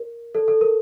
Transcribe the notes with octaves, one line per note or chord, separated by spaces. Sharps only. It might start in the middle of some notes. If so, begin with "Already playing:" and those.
Already playing: A#4
A4
A4
A#4